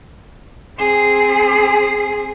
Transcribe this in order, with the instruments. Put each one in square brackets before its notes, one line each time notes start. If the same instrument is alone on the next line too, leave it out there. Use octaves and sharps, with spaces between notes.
[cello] C4 G#4